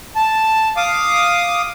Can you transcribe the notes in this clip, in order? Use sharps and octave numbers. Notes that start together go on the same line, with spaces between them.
A5
F5 D6 D#6